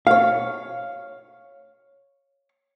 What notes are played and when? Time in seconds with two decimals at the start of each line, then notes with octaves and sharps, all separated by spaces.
0.07 C#5 F5